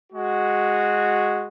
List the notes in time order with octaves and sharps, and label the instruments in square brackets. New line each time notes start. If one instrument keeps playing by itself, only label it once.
[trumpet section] G#3 F#4